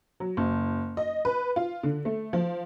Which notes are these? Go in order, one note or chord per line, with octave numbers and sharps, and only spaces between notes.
F#3
F#1
D#5
B4
F4
D3
A3
F3